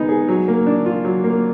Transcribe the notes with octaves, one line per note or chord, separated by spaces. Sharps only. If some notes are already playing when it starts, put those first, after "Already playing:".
Already playing: G#3 B3 D#4
G#4
F#3
A#3
D4
F4
F#3
A#3